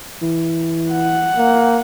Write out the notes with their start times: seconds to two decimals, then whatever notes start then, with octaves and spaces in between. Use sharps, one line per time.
0.22 E3
0.92 F#5
1.37 A#3